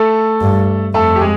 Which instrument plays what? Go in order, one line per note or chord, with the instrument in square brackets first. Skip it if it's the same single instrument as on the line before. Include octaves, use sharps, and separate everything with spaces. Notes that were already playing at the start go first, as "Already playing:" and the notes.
Already playing: [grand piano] A3 A4
[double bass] G2
[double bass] F2 [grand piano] A3 A4
[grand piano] G4
G#3 G#4